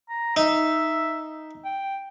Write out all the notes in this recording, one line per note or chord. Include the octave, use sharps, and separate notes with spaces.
A#5
D#4 E5
G5